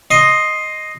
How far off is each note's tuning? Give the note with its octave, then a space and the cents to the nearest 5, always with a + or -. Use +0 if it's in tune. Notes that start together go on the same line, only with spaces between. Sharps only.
D#5 +0 C6 +10